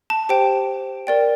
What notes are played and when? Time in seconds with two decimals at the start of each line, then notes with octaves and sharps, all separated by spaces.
0.10 A5
0.29 G4 C5 G5
1.07 A#4 D5 G5